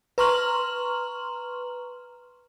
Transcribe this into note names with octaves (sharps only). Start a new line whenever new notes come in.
B4 A#5 C6 C#6 F6 F#7